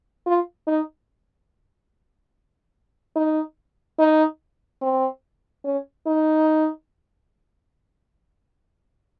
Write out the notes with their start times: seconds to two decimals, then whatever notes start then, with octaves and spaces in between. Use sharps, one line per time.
0.26 F4
0.67 D#4
3.15 D#4
3.99 D#4
4.81 C4
5.65 C#4
6.06 D#4